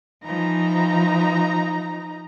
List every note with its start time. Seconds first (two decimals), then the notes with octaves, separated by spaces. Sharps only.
0.25 E3 F3 D#4 A#5